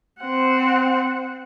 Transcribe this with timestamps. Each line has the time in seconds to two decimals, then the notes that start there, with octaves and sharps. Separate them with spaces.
0.22 C4 F#5